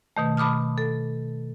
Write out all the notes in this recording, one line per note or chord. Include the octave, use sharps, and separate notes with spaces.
B2 D#3 A3
A5 B5 D6 D#6 F6
A4